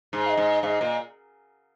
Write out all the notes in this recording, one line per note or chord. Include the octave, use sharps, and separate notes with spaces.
G#2
F5
D#5
G#2
G#2 D#5 F5
A#2